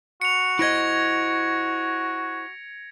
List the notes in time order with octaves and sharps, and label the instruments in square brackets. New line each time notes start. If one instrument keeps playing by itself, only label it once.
[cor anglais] F#4 [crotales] C#7 F7
[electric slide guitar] E4 C5 D#5 [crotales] G#6 A#6 D7